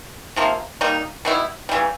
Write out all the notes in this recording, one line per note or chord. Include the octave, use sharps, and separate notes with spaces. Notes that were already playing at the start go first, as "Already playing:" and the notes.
C3 F3 A#3
G3 A#3 D#4
B2 G3 B3 E4
C#3 E3 G3